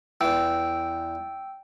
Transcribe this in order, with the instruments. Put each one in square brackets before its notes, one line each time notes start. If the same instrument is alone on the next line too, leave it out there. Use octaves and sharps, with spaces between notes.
[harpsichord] E2 E3 [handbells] G5 E6